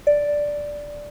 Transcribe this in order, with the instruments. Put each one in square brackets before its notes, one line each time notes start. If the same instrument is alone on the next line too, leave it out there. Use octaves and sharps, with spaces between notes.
[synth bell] D5